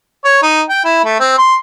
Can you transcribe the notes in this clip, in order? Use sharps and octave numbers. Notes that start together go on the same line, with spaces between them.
C#5
D#4
G5
E4
A3
C4
C6